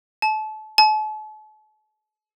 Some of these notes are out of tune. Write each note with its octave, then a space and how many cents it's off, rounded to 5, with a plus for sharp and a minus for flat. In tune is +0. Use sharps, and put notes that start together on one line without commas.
A5 -30
A5 -40